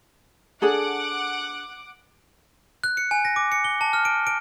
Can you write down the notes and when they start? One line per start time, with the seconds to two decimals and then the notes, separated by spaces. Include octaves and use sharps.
0.62 D4 G#4 A4 F#5 D6
2.84 F#6
2.97 C#7
3.11 G#5
3.25 A#6
3.36 D6
3.52 C#7
3.64 G7
3.81 A5
3.93 F6
4.05 D7
4.27 D7